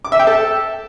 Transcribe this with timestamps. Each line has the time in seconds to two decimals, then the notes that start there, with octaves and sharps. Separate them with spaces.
0.05 D6
0.12 E5
0.19 G5
0.27 A4